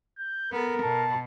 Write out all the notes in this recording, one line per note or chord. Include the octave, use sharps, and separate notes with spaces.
G6
B3 A4 A#4
B2 A5